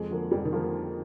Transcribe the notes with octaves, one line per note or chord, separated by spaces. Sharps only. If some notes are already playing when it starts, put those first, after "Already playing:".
Already playing: F2 G#3
D3 F3 A#3
F2 G3
D#3
D3 F3 A#3